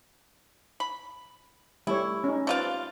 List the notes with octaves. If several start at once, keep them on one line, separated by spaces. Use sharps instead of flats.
B5
G3 A3 E4 C#5
C#4 D#4
C3 F4 B4 D5 F5 A5